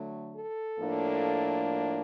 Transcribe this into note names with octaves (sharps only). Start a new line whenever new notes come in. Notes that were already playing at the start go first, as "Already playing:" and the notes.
Already playing: D3 F#3 A3
A4
A2 F3 A#3 D4